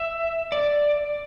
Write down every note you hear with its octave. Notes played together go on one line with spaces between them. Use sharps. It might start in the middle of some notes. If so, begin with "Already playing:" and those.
Already playing: E5
D5